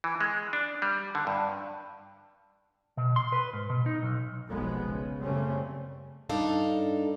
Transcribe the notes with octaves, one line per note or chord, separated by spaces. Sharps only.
E3
G#3
D4
G3
D3
G2
B2
C6
B4
G#2
B2
D#4
B1
F1 B1 F2 F3 G#3 B3
C#3
F#2 C#3 G3 A3 C4 C#4
G2 D4 D#4 A4 F5